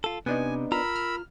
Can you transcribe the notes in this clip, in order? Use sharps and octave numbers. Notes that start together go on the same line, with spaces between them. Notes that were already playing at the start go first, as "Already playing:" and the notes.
F4 A4
C3 B3 D4 D#4 G#5
F4 A#4 A#5 B5 E6
F6